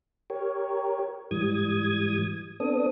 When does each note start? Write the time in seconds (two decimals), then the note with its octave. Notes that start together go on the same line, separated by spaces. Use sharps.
0.30 G4 A#4 C#5
1.31 G#2 E3 G3 D#6 G#6
2.60 B3 C4 D4 A4 D#6